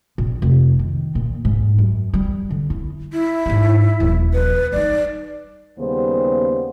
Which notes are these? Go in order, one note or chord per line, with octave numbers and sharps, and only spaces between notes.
A#1
F1
D#3
A#2
G#2
F#2
G3
D3
E4
E4
G#2 G3
D#1 F3
B4
G3 D#4 D5
D#2 C#3 G3 B3 C5